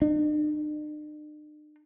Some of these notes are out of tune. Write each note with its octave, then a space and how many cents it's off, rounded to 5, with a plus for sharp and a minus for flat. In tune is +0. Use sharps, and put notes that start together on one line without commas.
D4 +45